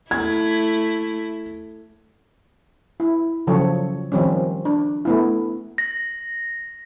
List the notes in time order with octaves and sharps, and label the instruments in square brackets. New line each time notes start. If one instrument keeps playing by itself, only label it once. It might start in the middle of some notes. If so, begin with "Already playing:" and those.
[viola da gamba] A3 E4 [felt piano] G#6
[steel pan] E4
C#3 F3 F#3 A4 C#5
D#3 F3 G3 C4 C#4
D4
A3 B3 E4
[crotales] A#6